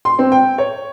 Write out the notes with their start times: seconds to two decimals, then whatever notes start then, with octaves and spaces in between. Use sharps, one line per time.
0.05 C6
0.19 C4
0.32 G5
0.58 C#5